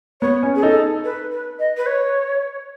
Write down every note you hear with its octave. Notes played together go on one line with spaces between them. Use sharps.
B3 C#5
C#4
G#4
D#4 A4
B4
B4
D#5
B4
C#5